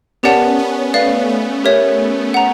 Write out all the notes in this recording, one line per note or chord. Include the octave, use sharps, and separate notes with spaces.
B3 C#4 G4 A#4 D5 F#5 A5
B3 C#4
A3 B3 B4 D5 F5
B3 C#4
G4 A#4 C#5 E5
F#5 A#5